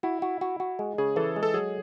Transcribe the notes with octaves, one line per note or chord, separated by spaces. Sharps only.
E4 F#4
F#4
F#4
F#4
G#3
C#3 G#4
E3 A4
G#3
A4
F#3 G#4